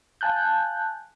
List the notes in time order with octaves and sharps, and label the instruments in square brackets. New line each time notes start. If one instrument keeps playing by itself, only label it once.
[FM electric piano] F5 G#5 A5 F#6 G6